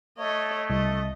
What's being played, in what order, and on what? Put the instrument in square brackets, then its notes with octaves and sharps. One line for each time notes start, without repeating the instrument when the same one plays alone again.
[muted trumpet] A3 [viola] C#5 D#5
[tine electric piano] C2 [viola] D#5